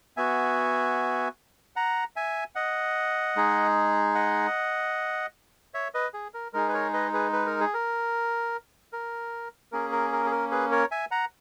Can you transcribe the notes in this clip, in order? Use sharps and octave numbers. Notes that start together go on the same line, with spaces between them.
B3 F#4 E5 G#5
F#5 A#5
E5 G#5
D#5 F#5
G#3 D#4 G#4
D#5 F#5
C#5 E5
B4 D#5
G#4
A#4
G#3 D#4 G#4 A#4
B4
A#4 C#5
B4 D#5
G#4 B4
B4
A#4
G#4
A#4
A#4
A#3 C#4 G#4 A#4
A#4
A#4
G#4
A#4
G#4 B4
A#4 C#5
E5 G#5
F#5 A#5